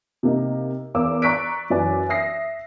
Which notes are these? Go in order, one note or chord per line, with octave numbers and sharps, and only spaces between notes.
C3 A#3 D#4
E2 A#4 F5 D6 E6
D5 A#5 C#6 F#6 B6 D7
F#2 E3 D5 G#5
E5 D#6 A#6 C7